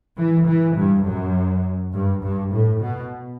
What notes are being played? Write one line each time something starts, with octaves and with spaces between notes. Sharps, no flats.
E3
E3
G2
F#2
G2
G2
A2
B2